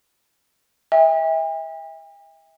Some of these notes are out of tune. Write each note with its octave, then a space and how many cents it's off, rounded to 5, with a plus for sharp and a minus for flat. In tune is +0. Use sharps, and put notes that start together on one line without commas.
E5 -30 G5 +45